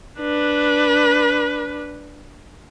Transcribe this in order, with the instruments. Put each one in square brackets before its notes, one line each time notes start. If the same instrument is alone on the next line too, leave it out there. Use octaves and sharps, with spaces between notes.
[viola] D4 B4